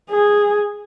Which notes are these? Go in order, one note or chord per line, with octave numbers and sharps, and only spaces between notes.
G#4